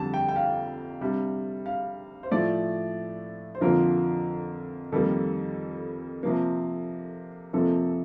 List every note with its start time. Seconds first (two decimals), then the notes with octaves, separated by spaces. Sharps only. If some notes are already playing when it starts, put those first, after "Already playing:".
Already playing: F2 D3 G3 A5
0.14 G5
0.29 G5
0.36 F5
1.01 C3 G3 D4
1.66 F5
2.23 C5
2.31 A2 F3 A3 D5
3.55 C5
3.61 F2 D3 F3 A#3 F4 A#4
4.92 F2 D#3 G3 A#3 A4
6.23 C3 F3 A#3
7.53 F2 C3 F3 A#3 A4